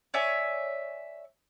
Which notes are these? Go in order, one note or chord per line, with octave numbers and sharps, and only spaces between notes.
C#5 D5 E5 G#5